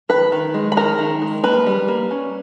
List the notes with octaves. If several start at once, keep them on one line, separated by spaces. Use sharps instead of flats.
D#3 B4 B5
D#3
G#3
B5
D#3 A#4 A#5
D#3
G#3
A#3 B4 B5
G3
A#3
C#4